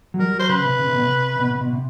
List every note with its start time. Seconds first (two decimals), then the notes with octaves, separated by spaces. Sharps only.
0.14 F#3
0.19 G3 A#4
0.34 F#3
0.40 C5
0.49 C#3 B4
0.64 C3
0.79 C#3
0.87 C3
0.94 B2
1.03 C3
1.39 B2
1.50 C3
1.61 B2
1.73 C3